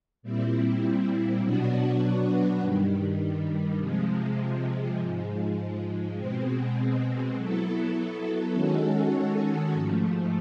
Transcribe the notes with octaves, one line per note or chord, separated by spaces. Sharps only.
A#2 G3 C4 E4
B2 F#3 B3 D4 F#4
G2 D#3 G3
C3 F3 G#3
G#2 F3 G#3
B2 G#3 C4
F#3 B3 E4 A4
D#3 G#3 C#4 F#4 A4
G#2 F3 A3